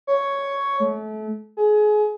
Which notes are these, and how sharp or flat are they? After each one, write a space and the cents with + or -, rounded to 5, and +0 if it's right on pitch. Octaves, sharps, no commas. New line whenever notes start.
C#5 +5
A3 -30
G#4 +25